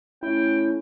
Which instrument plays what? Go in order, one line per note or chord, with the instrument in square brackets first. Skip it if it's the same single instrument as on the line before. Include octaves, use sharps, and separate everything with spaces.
[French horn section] A3 C#4 [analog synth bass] E4 [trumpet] G5